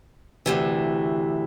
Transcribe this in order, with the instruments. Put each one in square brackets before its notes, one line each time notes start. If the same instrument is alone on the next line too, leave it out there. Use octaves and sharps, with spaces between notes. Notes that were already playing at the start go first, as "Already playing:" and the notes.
[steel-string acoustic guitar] D2 C3 E3